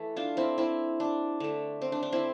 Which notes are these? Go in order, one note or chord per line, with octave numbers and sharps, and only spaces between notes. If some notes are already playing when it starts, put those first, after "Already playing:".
Already playing: E3 A3 A4
D4 F4
C4 E4
C4 E4
D4
D3 A3
C4
D4
D4
C4 E4